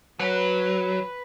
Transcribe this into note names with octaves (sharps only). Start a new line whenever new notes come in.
F#3 B4